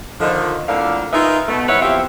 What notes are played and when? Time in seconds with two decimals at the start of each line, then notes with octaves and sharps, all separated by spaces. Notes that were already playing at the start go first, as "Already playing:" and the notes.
0.20 D3 D#3 F3
0.68 F2 A2 D3 A#3 F5
1.13 D#4 F4 G#4 A#4 B4 E5
1.48 B2 A3
1.69 E2 G#2 B4 C#5 E5 F#5
1.81 E2 F3 C4 G4 E5 F5